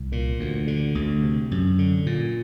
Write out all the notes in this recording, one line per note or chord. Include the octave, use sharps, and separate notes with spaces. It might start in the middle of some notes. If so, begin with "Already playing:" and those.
Already playing: C2
A#2
D2
D3
D2
C3
F#2
D3
A#2